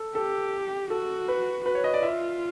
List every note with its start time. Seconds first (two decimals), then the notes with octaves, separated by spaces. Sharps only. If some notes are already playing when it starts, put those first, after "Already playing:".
Already playing: A4
0.15 G4 A4
0.90 F#4 A4
1.28 B4
1.65 F#4 B4
1.75 C#5
1.84 D#5
1.94 D5
2.03 F4 E5